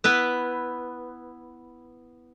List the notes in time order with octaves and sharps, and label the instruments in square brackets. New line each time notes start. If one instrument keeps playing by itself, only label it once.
[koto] B3 E4 B4